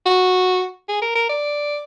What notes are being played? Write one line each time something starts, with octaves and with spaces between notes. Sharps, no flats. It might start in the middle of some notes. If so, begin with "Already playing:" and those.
F#4
G#4
A#4
A#4
D5